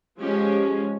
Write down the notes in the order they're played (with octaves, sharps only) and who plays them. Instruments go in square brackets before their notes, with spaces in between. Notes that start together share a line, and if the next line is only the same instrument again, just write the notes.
[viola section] F3 G#3 C#4 G4